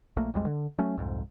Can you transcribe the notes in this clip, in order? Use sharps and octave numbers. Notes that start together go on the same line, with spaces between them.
A#1 A3 A#3
B1 F2 G3 G#3
D3
F#3 A3 C#4
C2 F2 G#2